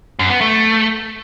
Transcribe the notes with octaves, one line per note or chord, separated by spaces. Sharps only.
F#2
B3
A3